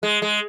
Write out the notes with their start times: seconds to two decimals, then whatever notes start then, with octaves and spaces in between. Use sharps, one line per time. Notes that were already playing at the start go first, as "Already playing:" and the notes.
0.03 G#3
0.22 G#3